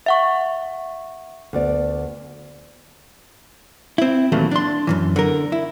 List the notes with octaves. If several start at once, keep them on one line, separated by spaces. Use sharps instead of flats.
E5 F#5 C#6
D2 B3 D5
C4 E4
D#2 A#2 E3 F#3 A3
D4 C6
F#2 A2 E3
D3 A#4
E4